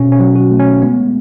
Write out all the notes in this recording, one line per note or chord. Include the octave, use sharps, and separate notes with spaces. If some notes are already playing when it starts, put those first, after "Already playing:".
Already playing: B2 C#4
C#4
F#3
F#4
A3
C#4
G#3 B3